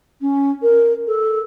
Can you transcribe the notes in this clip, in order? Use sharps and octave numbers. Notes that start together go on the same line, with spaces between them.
C#4
A#4
A4